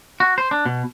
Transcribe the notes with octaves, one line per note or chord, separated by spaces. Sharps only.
F#4
C5
D4
B2